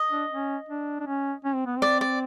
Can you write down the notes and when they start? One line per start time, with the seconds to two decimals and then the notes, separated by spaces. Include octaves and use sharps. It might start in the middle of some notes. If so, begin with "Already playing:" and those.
Already playing: D#5
0.11 D4
0.30 C#4
0.69 D4
1.00 D4
1.06 C#4
1.45 C#4
1.55 C4
1.66 B3
1.77 C4
1.82 D5
2.01 D5